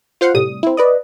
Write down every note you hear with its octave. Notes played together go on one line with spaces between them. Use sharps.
F4 C5 F5 F#5
A2 C3 G3 D#6
C4 E4
B4 D5 D#5